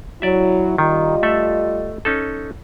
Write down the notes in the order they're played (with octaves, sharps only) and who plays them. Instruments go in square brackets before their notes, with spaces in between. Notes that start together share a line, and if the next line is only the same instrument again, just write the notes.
[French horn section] F#3 E4 [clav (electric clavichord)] D5 E5
[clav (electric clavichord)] D#3 [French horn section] G3 F4 D#5
[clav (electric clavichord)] A3 A4 E5
C#4 D#4 A4